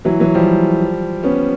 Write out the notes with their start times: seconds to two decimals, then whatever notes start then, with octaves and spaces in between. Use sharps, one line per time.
0.05 E3 F#3
0.20 E3 F#3
0.34 F3 G3
1.23 B3 C#4